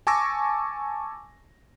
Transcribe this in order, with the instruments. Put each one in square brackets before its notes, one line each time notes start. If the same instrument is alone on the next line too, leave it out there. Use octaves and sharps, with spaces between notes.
[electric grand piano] G#5 A5 C#6 D6 E6 A#6